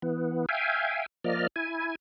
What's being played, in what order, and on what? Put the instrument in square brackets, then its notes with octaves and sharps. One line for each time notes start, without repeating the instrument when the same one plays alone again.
[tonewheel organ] E3 B3
E5 F5 G5 G#5
F3 A#3 D5 D#5 F6
E4 G#5